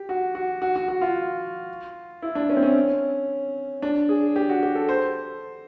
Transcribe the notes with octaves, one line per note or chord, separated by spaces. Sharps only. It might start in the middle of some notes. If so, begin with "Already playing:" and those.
Already playing: G4
F#4
F#4
F#4
F#4
F#4
F4
E4
D4
C#4
C4
C#4
D4
G#4
G4
F#4
G4
A4
C5